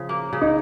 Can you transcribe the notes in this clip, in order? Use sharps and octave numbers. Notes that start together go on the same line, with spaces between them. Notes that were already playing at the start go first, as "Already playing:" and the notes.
Already playing: C#3 F3
A#3
C#3
D#4